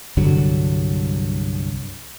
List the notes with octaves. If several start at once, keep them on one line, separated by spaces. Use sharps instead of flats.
C2 G2 D3 F#3